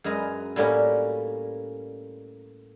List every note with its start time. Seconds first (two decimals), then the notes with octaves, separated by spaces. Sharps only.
0.04 F#2 G#3 B4 D#5 A#5
0.56 A2 G3 A#3 C#4 F#4